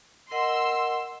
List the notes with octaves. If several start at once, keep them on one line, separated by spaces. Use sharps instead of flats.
A#4 D#5 F#5 C6 E6